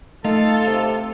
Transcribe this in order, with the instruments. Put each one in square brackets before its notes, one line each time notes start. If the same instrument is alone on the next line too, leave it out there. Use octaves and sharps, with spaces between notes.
[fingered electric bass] A3 [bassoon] D#4 [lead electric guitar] F4 [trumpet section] A4
[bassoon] C3